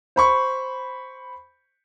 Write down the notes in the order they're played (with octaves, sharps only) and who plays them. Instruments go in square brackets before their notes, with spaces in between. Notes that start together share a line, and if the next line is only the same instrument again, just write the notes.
[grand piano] C5 B5 C#6